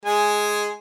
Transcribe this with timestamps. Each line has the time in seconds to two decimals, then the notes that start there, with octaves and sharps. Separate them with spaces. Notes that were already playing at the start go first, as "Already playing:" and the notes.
0.05 G#3 G#5